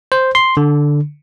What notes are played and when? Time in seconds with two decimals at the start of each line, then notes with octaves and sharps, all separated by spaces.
0.12 C5
0.35 C6
0.57 D3